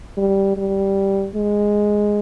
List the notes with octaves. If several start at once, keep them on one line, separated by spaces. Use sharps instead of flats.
G3
G3
G#3